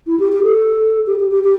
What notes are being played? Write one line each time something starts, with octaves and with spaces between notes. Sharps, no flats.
E4
G4
G4
A4
G4
G4
G4
G4